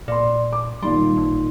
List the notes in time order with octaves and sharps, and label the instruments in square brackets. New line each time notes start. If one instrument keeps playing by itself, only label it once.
[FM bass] A#2 [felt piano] D5 C6
[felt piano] D6
[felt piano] A#2 D#3 C6 [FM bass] G3
[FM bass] A1